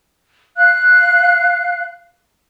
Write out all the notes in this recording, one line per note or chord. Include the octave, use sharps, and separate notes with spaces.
F5 F#6